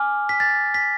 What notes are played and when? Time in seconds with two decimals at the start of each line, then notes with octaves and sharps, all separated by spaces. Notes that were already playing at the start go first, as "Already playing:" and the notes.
Already playing: G#5 D6 F6
0.29 B6
0.40 A6
0.74 B6